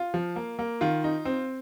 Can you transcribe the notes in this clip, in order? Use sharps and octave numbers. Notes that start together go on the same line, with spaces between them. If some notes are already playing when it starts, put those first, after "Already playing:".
Already playing: F4
F3
A#3
A#3
D#3 F4
D#4
C4